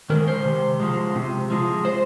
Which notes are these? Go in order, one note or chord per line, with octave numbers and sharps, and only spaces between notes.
D#3 G#3 A#4
C5
C3
F3 G#3
C3
F3 G#3
C5